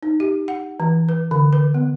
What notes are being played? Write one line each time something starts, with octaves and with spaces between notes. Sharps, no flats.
D#4
G4
F#5
E3
B4
D3
B4
B3